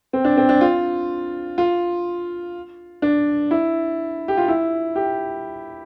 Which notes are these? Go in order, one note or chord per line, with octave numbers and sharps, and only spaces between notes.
C4
D4
C4
D4
F4
F4
D4
E4
G4
F4
E4
G4